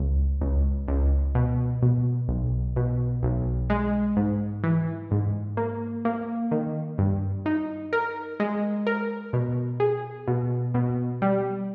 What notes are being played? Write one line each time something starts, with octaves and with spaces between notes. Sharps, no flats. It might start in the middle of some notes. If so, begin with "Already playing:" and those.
Already playing: C#2
C#2
C#2
B2
B2
B1
B2
B1
G#3
G#2
E3
G#2
A#3
A#3
D#3
G2
D#4
A#4
G#3
A#4
B2
G#4
B2
B2
G3